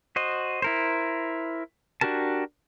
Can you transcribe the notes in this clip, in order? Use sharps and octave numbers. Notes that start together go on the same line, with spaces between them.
F#4 C5 D#5
E4 A#4 C5
D4 F#4 G4 A#4 A5